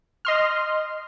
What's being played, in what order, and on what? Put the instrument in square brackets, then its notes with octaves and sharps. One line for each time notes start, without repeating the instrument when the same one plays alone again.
[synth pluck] D#5 C6 F6